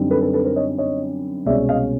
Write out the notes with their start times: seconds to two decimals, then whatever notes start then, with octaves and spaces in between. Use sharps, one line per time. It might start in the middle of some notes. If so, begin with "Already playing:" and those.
Already playing: F#2 D3 G3 C4 D#4
0.11 A4 B4
0.22 A4 B4
0.33 A4 B4
0.44 A#4 C5
0.56 C#5 D#5
0.78 C#5 D#5
1.46 C2 B2 G#3 C#4 D5 E5
1.69 D#5 F5